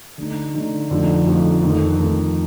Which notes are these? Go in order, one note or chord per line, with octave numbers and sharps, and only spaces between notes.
D3 A3 D#4
D3 A3 D#4
F2 D3 F3 A3 D#4
F2 D3 F3 A3 D#4
F2 D#3 A3 D#4
F2 D#3 A3 D#4